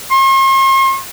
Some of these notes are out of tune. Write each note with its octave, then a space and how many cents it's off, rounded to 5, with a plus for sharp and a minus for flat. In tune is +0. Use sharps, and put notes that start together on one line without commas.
C6 +45